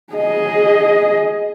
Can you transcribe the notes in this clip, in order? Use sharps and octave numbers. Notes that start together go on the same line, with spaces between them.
G#4 D#5